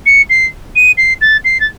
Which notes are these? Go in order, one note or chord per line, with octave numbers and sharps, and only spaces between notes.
C#7
C7
D#7
C7
A6
C7
A6